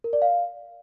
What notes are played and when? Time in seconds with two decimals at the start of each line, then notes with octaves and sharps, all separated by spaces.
0.04 A#4
0.13 D5
0.22 F5